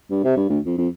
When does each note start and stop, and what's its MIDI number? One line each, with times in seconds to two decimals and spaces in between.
0.10 0.21 43
0.24 0.35 48
0.37 0.46 43
0.50 0.59 38
0.66 0.78 41
0.78 0.88 41